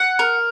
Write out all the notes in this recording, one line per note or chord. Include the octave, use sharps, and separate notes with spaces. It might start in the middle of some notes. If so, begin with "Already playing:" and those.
Already playing: F#5
A#4